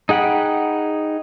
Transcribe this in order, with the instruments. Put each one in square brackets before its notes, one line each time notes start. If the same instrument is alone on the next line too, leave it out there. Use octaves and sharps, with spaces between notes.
[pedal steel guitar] D#4 G#4 F#5 G5 B5